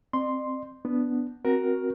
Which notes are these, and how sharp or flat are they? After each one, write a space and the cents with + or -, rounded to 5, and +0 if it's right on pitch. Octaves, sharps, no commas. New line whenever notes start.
C4 +0 D5 +45 C6 +0
B3 +0 D4 -5
C4 +0 F#4 +0 A#4 +10